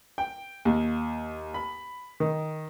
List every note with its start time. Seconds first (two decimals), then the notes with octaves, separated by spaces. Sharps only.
0.18 G5
0.65 D#2
1.54 B5
2.20 D#3